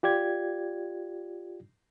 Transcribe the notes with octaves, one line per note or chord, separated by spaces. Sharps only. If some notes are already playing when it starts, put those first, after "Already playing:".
F4 G4 D5 G#6